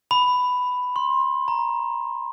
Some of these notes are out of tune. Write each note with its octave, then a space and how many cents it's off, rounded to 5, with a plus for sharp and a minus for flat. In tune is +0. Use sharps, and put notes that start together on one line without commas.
B5 +10
C6 +30
A#5 +15